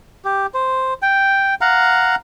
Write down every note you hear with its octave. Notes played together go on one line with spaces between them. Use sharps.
G4
C5
G5
F5 F#5 A#5